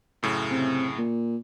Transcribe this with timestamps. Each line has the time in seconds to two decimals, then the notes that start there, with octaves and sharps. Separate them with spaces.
0.23 F#2 A2 C#3
0.50 C3
0.98 A#2